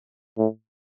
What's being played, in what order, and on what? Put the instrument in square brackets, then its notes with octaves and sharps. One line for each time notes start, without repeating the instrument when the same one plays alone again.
[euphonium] A2